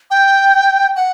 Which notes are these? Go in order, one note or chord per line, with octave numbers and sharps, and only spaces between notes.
G5
F#5